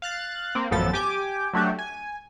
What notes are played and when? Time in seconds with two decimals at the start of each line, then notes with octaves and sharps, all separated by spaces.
0.02 F5 F#6 A6
0.55 A#3 C4
0.71 A1 F#2 F3 B3 A4 A6
0.93 G4 G5 G#5 D6
1.54 F#3 A3 D4 F#4 G4
1.79 G#5